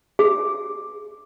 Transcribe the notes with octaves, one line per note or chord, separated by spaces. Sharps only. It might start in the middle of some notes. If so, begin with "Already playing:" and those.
G#4